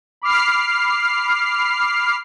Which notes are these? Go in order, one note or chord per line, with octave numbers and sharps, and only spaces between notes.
B5 D6 F6 C7